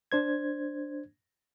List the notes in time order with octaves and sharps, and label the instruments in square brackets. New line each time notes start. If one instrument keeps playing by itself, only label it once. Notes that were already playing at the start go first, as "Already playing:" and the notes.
[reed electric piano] D4 C5 G#6